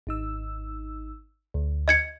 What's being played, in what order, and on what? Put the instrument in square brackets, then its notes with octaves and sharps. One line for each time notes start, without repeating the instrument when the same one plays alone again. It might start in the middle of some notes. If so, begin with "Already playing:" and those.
[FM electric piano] G#1 D#4 E6
D2
[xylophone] D#5 G#6 C#7